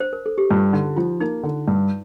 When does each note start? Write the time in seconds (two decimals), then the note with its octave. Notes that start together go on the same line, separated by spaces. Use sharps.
0.00 C5
0.13 A#4
0.26 A4
0.38 G4
0.50 G2 F4
0.73 D3 D#4
0.96 F3 F4
1.20 A#3 D#4
1.43 D3
1.68 G2